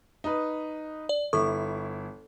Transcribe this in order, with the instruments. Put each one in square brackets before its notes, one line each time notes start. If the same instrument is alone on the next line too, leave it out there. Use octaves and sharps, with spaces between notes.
[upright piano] D#4 B4
[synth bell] D5
[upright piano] G1 E4 [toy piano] A4 [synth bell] C#6